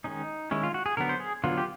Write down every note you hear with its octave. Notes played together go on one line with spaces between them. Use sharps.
D#3 G#3 C#4 D#4
D#3 G#3 C#4 E4
F4
F#4
G#4
D3 F#3 B3 A#4
C5
G#4
D3 F#3 B3 F4
G4